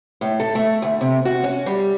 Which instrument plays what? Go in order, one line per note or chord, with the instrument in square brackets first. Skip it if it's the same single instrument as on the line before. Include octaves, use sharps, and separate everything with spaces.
[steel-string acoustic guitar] A2
A4
A3
D2
C3
F#4
C#4
G3